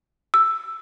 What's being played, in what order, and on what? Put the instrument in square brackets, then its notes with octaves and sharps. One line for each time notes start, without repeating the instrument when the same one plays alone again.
[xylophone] E6